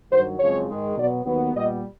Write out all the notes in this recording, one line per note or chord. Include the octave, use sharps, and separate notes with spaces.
G2 D#3 F#3 C5
F#2 C#3 F3 G#3 C4 C#5
G#2 D#3 G#3
B2 F#3 B3 D5
D#2 D#3 F#3 B3
A#2 G3 B3 D#5